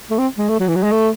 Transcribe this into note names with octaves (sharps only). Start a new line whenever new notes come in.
A3
C4
G#3
A3
F#3
E3
F#3
G#3
A3